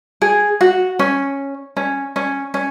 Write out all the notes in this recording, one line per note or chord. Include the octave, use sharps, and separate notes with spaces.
G#4
F#4
C#4
C#4
C#4
C#4